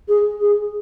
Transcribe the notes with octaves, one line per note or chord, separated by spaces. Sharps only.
G#4
G#4